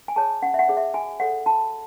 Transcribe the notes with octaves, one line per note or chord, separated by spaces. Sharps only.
G#5
G#4 C#5 A5
C#4 F#5
E5
F#5
G#4 C#5
E5
F#4 G#5
A4 C#5 F#5
F#4 A5